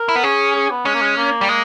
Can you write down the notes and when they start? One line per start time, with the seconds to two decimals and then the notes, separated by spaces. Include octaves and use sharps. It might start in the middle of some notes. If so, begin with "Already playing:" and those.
Already playing: A#4
0.09 E4
0.16 B3
0.23 C#4 G#4
0.55 G#4
0.71 B3
0.85 G#3 C#4
0.95 A#3
1.01 G#3
1.17 A#3
1.41 G3
1.48 G#3 A#3